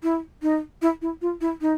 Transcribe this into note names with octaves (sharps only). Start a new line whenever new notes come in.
E4
D#4
E4
E4
F4
E4
D#4